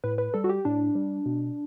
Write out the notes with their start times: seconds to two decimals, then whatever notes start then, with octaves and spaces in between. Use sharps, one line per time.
0.04 A2 B4
0.18 B4
0.34 G3 A4
0.44 F#4
0.49 G4
0.65 A2 D4
0.95 G3
1.26 B2